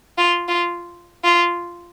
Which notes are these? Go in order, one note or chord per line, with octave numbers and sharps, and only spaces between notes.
F4
F4
F4